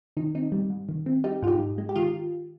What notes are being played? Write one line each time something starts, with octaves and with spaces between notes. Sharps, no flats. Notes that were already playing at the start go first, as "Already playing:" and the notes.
D#3 D#4
C4 D#4
G3
G#2
D#3
C4
G3 D#4 G4
G#2 D#4 F4 G4
G#2
G#3
G4
D#3 F4